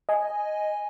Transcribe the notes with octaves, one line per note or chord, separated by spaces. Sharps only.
D#5 G#5